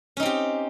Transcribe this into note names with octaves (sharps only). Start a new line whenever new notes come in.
C4 C#4 D#4 G4